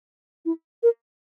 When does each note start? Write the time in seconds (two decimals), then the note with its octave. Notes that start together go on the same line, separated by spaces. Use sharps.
0.45 E4
0.83 A#4